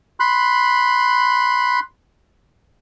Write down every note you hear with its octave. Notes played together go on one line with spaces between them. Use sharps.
B5 C6 F#6